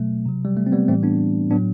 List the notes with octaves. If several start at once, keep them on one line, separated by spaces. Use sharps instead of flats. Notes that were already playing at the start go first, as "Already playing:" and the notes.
Already playing: B2 F#3 A3
C3 F#3
G3
A3
C4
G3 B3
A2 E3 G3 A3 C4
B3 D4
A2 F#3 B3 D4